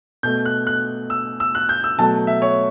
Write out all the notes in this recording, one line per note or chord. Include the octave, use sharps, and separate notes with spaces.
B2 A3 G6
F#6
F#6
E6
E6
F#6
G6
E6
B2 F#3 A3 A5
E5
C#5